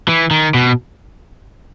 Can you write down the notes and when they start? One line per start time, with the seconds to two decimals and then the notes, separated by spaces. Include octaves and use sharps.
0.08 E3
0.31 D#3
0.54 B2